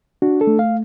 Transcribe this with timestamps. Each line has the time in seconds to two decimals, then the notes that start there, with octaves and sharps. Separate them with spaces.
0.22 D4 F#4
0.41 A4
0.47 A3
0.59 F5